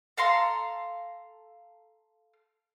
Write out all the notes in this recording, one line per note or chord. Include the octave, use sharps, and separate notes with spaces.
A4 F5 A#5 C6